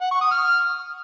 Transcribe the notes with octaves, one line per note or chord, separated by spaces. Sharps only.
F#5
C#6
D#6
F6